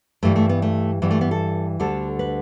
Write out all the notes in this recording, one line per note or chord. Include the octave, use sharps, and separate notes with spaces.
G2 E3 G3 A3
A3
B3
A3
G2 E3 G3 B3
A3
B3
A4
D2 D3 G3 A4
B4